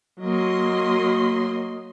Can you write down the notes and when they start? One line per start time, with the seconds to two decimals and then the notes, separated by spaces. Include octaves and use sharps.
0.21 F#3 A#3 D#5 C6